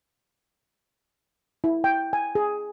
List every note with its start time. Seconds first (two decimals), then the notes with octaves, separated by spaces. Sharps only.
1.64 E4
1.84 G5
2.13 G#5
2.35 G#4